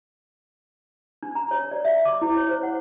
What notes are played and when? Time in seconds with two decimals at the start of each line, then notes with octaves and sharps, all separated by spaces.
1.23 D4
1.35 A#5
1.51 C#5
1.71 D5
1.85 E5
2.05 D6
2.21 E4
2.37 C#5
2.49 C5
2.63 F#5